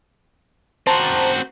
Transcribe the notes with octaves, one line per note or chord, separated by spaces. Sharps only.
C4 F#4 C5 A5 A#5